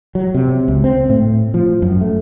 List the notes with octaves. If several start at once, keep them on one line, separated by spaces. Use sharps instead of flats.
F#3
C3
C#2
C4
A2
F3
F#2
A3